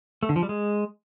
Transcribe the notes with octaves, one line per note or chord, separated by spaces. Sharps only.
A3
D3
F3
G3
G#3